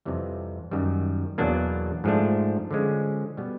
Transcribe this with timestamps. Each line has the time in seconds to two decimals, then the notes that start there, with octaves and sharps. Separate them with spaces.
0.05 F2 C3 E3 G3
0.71 F#2 D#3 G3
1.38 E2 B2 F#3 A#3 D4
2.04 G#2 F3 A3 D4
2.71 D3 F3 G#3 C#4
3.37 B2 G3 B3